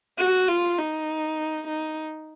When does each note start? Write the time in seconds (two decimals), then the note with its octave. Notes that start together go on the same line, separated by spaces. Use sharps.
0.19 F#4
0.48 F4
0.79 D#4
1.68 D#4